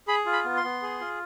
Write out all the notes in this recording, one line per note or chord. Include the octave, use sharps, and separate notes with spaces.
G#4 B5
F4
B5
B3
C6
B3
G#4
F4